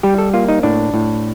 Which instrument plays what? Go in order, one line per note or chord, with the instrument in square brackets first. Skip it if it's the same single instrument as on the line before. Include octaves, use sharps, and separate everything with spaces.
[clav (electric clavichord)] G3 G4
A4
A#3 F4
D#4
A2 D4
A2